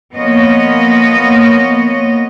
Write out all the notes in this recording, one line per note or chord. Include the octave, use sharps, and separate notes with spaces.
F3 A#3 B3 C#5 D#5